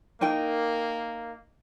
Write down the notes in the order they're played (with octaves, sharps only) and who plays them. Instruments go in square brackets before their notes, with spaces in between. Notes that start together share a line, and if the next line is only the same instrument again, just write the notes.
[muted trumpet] A#3 [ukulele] D#4 A#4 G5